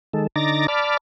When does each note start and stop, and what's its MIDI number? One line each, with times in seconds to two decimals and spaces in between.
0.13 0.27 51
0.13 0.27 56
0.13 0.27 69
0.36 0.67 50
0.36 0.67 63
0.36 0.67 82
0.36 0.67 86
0.36 0.67 93
0.36 0.67 94
0.68 0.97 74
0.68 0.97 81
0.68 0.97 83
0.68 0.97 86
0.68 0.97 89